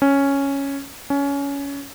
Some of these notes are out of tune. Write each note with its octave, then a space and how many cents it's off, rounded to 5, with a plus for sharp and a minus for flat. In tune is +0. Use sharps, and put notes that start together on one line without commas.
C#4 +0
C#4 +20